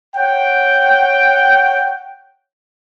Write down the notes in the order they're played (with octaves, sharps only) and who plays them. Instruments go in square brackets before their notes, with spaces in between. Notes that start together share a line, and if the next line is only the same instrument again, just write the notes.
[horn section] C#5 F#5 G5